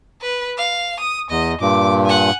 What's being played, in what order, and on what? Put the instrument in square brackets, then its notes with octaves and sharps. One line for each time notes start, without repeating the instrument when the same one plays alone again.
[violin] B4
F5
D#6
[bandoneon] E2 [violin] D#5
[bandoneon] G2 A#2 [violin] D6
[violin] F#5 G#5